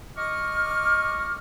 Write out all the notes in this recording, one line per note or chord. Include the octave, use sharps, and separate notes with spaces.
D#5 C#6 D6 F6